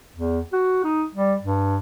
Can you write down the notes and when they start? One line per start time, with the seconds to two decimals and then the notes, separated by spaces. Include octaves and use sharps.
0.16 E2
0.53 F#4
0.85 D#4
1.15 G3
1.43 G2